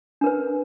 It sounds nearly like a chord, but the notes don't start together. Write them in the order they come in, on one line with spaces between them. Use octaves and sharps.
D4 A#4 B4